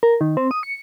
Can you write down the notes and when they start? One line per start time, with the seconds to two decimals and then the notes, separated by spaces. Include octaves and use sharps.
0.03 A#4
0.21 D#3
0.37 C4
0.51 D#6
0.63 C#7